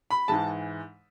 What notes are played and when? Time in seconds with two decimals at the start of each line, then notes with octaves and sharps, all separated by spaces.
0.10 B5
0.28 G#2 E3 G#3 A5